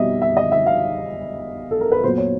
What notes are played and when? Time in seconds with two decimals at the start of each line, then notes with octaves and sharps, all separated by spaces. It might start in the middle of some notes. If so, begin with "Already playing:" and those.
Already playing: B2 G3 C4 D#5 E5
0.22 E5
0.37 D#5
0.52 E5
0.66 F5
1.71 A4
1.81 A#4
1.92 B4
2.04 A#2 F#3 B3 C5
2.18 C#5